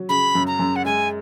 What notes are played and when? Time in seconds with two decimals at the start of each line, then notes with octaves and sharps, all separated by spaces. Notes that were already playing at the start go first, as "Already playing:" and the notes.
Already playing: F#3
0.09 C#3 B5
0.35 F#2
0.47 A#5
0.59 F#2
0.76 F#5
0.85 G#3 G#5